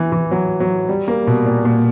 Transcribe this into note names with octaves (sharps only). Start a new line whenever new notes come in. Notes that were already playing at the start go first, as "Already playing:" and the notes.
Already playing: E3
E3
F#3
F#3
G3
A#3
B2
A#2
A#2